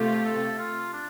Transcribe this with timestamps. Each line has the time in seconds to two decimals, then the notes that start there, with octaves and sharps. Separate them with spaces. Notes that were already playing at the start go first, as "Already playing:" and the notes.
Already playing: C3 A3 F4 G4
0.25 A4
0.59 F4
0.93 D4